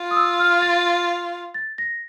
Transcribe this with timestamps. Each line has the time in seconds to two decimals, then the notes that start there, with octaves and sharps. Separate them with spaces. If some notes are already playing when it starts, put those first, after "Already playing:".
Already playing: F4
0.11 D#6
0.16 E6
0.39 F6
0.62 A6
1.54 A6
1.78 A#6